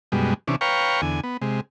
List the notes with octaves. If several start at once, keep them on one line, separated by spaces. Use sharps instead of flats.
F#2 B2 G3 G#3
C3 E3 C#4 D4
B4 C#5 F5 G5 A#5 C#6
E2 D3 G#5
B3
C3 G#3